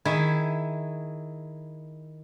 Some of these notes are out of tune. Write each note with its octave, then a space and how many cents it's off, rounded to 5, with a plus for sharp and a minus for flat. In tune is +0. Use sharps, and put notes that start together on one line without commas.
D#3 +0 E4 +0 G#4 +0